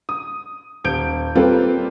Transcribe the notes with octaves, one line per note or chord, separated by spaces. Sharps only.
D#6
D#1 G6 D7
G3 A#3 C4 F4 A4 B4